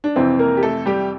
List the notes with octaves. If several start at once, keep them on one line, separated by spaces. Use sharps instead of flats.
D4
F2 C3 E3 C4
A#3 A#4
G4
A3 A4
G3 G4